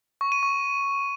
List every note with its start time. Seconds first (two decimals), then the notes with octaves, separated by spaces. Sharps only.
0.21 C#6
0.32 D#7
0.43 C#6